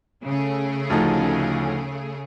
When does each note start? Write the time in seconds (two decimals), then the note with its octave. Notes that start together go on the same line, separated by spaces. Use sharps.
0.24 C#3 A3 G#4
0.90 D2 F3 D#4